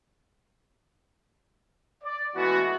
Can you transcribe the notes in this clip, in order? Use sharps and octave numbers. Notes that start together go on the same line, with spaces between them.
D5
E3 G#3 A3 B3 F#4